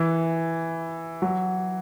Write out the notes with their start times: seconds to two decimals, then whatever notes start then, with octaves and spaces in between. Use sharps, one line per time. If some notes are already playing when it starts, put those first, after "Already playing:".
Already playing: E3
1.22 F#3